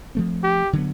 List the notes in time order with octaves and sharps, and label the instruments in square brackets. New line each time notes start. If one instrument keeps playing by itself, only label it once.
[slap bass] F3 A3 C4
[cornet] G4
[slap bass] D3 F#3 B3